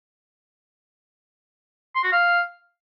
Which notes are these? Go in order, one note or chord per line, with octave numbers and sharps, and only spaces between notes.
C6
F#4
F5